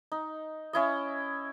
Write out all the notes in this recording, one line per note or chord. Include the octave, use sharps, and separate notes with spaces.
D#4
C#4 E4 D#5